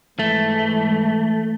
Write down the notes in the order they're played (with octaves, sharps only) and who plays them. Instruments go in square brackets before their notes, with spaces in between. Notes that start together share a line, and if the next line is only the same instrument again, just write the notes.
[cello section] G#2 E3 [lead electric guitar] A3